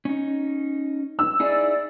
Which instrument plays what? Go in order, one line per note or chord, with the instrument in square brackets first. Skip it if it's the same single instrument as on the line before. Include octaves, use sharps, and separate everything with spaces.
[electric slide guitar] C#4 D#4
[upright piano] E6
[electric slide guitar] D#4 E4 G#4 [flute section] D5